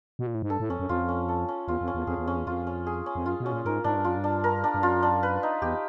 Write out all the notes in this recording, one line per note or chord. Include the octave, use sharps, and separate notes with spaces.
B2
A#2
A2
G#2
G2 A4
A2
F2 C#4
F#2
F2 F4
C#4
A4
C#4
E2 F4
F2
C#4
E2
F2 G#4
E2
F2 C#4
E2
F2 F4
C#4
G#4
C#4
F2
F#2 F4
B2
C#4
A#2
G#2 A#4
G#2 D4
G2
F#2 F4
G2
D4
A#4
D4
G2
F#2 F4
D4
B4
D#4
E2 G4